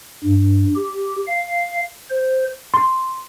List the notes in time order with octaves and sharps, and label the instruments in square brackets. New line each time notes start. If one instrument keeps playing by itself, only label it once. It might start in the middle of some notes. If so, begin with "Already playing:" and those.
[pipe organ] G2
G4
F5
C5
[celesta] C6